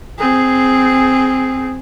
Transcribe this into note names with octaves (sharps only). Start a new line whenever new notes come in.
C4 G#4